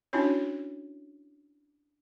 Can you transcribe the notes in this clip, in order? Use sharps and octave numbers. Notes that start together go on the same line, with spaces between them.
C#4 D4 E4 F#4 C#5